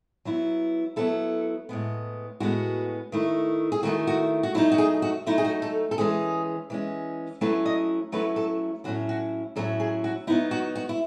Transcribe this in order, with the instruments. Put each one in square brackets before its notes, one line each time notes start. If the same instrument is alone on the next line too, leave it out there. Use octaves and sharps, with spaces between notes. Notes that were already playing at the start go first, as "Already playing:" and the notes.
[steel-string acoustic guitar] F#3 B3 E4
F#3 B3 E4 A4
A2 G#3 B3
A2 G#3 B3 F#4
D#3 A3 E4
G#4
D#3 A3 E4 F#4
F#4
F#4
F#3 A3 D#4 E4
F#4
G#4
F#4
F#3 A3 D#4 E4
G#4
F#4
A4
A4
E3 G#3 C#4 G#4
E3 G#3 C#4
F#3 A3 C#4 E4 B4
D#5
F#3 A3 C#4 E4 B4
A4
A2 F#3 C#4 E4 F#4
F#4
A2 F#3 C#4 E4 A4
G#4
F#4
F#3 B3 D#4 E4
F#4
F#4
E4